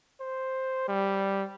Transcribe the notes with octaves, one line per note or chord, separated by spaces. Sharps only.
C5
G3